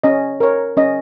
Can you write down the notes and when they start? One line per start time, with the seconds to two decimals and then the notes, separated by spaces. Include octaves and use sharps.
0.04 C#4 D#5
0.40 A#4 C#5
0.77 C#4 D#5